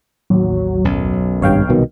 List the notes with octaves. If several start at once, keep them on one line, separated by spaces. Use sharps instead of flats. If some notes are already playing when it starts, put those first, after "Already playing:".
A1 D#2 F#3
B1 F#2
G#1 G2 C#5 F5 G5
C2 B2 D#3